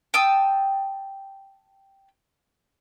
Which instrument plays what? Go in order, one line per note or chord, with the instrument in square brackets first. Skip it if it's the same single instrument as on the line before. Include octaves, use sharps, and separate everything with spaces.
[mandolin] G5 A5 D#6 E6